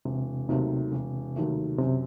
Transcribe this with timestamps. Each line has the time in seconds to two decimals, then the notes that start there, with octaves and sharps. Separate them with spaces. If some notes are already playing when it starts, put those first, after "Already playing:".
0.05 E1 C3
0.49 D#2 C3 D#3 F#3 A3
0.92 E1
1.36 D#2 D#3 F#3 A3
1.79 F#2 C3